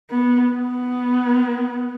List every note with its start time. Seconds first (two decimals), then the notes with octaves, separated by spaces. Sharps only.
0.11 B3
0.52 B3